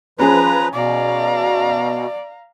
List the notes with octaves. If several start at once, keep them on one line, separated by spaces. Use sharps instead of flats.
F3 C#4 G#4 B4 A#5
B2 D5 F5 A#5